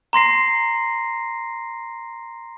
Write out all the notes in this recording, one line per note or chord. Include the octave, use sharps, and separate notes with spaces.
A#5 C6 A#6 C7